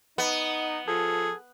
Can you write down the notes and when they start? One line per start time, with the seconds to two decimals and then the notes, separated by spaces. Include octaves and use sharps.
0.18 B3 D#4
0.87 F3 G#4 A4